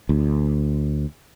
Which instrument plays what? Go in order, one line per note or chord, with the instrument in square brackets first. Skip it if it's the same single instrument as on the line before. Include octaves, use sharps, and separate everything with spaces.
[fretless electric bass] D2